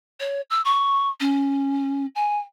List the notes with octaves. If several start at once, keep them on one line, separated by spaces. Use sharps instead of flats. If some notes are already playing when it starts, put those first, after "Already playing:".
C#5
E6
C#6
C#4
G#5